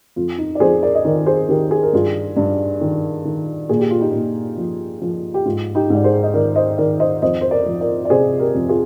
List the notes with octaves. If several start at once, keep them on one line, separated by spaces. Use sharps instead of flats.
F2 F4
D#4
D5
F2 G#4 C5
A#4 D5
D#5
D#3 A#4 D5
G#4 C5
D#3 G4 A#4
G#4
A#4
G2 F4 G#4
G2
D#3
D#3
A#2 G#4
G4
F4
D#4 G4
A#2
F3
F3
G4
G#2 F4
D#4 G4
G#2 D5
G#4 C5
D#5
D#3 A#4 D5
C5 D#5
D#3 A#4 D5
C5 D#5
F2 C5 D#5
C5
A#4 D5
F3
A#4 D5
D5
C3 G#4 C5
G4 A#4
F2
F4 G#4